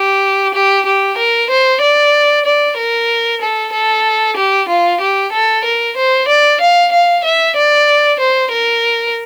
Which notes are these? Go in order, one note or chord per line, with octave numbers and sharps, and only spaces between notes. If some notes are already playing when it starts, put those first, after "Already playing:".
Already playing: G4
G4
G4
A#4
C5
D5
D5
A#4
A4
A4
G4
F4
G4
A4
A#4
C5
D5
F5
F5
E5
D5
C5
A#4